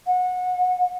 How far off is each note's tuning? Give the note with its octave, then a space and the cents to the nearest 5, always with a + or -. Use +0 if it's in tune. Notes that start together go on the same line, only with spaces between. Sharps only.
F#5 -25